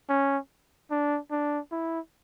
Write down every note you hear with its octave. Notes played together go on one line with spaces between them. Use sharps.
C#4
D4
D4
E4